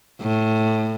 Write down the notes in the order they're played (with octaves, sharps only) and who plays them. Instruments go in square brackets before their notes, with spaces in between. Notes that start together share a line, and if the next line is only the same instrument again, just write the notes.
[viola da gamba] A2